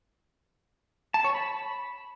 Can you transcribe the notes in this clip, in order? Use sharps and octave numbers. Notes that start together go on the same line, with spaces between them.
A5
C#5
B5